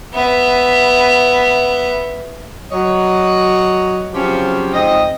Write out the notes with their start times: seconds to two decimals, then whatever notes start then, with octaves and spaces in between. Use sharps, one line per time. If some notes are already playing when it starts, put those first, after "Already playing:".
0.14 B3 E5
2.71 F#3 C#5 D#5
4.13 C#3 F3 F#3 C4 C#4 G4
4.73 F2 G#2 C4 D#5